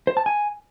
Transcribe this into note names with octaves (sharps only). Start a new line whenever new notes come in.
C5
A5
G#5